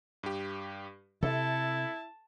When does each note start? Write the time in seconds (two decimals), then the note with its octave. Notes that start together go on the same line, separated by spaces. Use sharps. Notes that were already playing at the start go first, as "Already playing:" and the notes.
0.23 G2 G4
1.23 C3 E4 A4 A5